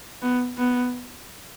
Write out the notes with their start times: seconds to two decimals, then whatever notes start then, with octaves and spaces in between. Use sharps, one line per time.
0.22 B3
0.58 B3